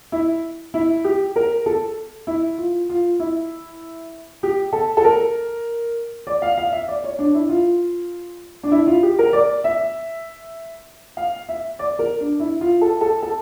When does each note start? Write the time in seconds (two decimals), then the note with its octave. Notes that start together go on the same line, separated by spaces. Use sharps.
0.12 E4
0.74 E4
1.04 G4
1.36 A#4
1.66 A4
2.27 E4
2.58 F4
2.89 F4
3.20 E4
4.43 G4
4.73 A4
4.97 A4
5.04 A#4
6.27 D5
6.42 F5
6.58 F5
6.72 E5
6.88 D5
7.04 C#5
7.19 D4
7.35 E4
7.49 F4
8.63 D4
8.72 E4
8.87 F4
9.03 G4
9.19 A#4
9.33 D5
9.64 E5
11.17 F5
11.49 E5
11.79 D5
11.99 A#4
12.20 D4
12.40 E4
12.61 F4
12.81 A4
13.01 A4
13.23 A4